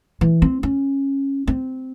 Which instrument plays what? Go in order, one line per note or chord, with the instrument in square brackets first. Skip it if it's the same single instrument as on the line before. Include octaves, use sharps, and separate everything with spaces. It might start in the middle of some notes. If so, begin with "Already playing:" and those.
[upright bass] E3
C4
C#4
C4